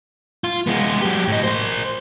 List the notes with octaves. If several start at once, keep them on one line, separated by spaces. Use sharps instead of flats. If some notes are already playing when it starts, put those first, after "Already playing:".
F4
G#3 B3
F#3 G4
A2 D#5
A#4 C5